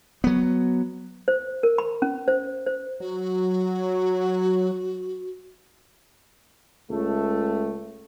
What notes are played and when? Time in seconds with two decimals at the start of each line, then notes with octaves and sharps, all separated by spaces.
0.24 F#3 B3
1.28 C5
1.63 A#4
1.78 B5
2.02 C#4
2.28 C5
2.66 C5
3.00 F#3 F#4
6.90 C#2 A3